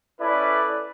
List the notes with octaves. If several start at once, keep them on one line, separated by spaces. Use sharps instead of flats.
C#4 E4 A4 B4 D5